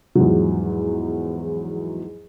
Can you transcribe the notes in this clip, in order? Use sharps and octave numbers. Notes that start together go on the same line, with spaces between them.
E2 G#2 F3 F#3